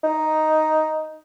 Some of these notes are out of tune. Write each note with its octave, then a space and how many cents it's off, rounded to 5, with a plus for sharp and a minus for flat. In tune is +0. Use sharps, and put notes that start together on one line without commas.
D#4 +5